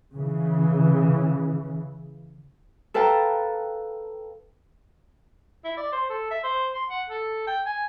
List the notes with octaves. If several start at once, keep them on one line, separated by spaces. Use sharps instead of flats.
C#3 E3
A4 B4 F5 G5 A5 A#5
E4
D5
C5
A4
E5
C5
C6
F#5
A4
G5
G#5